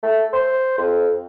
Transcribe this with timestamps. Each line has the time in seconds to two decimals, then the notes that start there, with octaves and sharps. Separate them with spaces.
0.03 A3
0.33 C5
0.78 F2